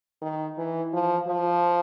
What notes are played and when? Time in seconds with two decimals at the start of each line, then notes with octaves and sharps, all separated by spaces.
0.22 D#3
0.58 E3
0.93 F3
1.28 F3